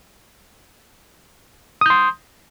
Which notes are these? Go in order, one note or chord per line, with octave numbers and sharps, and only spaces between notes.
C6 D#6 G6